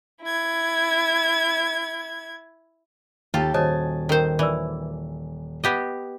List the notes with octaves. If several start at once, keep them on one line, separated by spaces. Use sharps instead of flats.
E4 G#6
D#2 F4 G4 A4 A5
D#1 F#4 G#4 C5 C#5 D#5 G#5 A5
D#3 A4 A#4 C5 G5
E3 D4 D5 E6
B3 G4 D#5